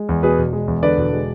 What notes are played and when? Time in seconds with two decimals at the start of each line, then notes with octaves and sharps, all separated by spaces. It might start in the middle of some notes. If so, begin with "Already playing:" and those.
Already playing: G#3
0.09 E2
0.23 B2 G#4 B4
0.39 E1
0.53 G#3
0.68 E2
0.83 D3 B4 D5
0.98 E1
1.13 G#3